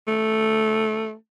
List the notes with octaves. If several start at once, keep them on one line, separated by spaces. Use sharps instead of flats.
A3